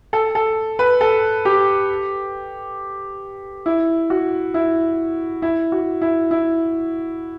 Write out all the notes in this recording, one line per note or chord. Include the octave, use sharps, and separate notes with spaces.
A4
A4
B4
A4
G4
E4
F#4
E4
E4
F#4
E4
E4